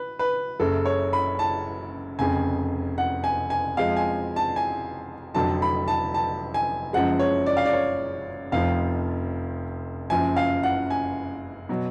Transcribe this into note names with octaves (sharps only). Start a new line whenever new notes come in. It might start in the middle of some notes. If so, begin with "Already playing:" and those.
Already playing: B4
B4
F#1 F#2 C#3 A4
C#5
B5
A5
F1 F2 C#3 G#5
F#5
G#5
G#5
F2 F3 G#3 F5
G#5
A5
G#5
F1 F2 D3 F#3 A5
B5
A5
A5
G#5
F#1 F#2 F3 G#3 F#5
C#5
D5
F5
D5
C#5
F1 F2 F3 F5
F#1 F#2 F3 G#5
F5
F#5
G#5
B2 F#3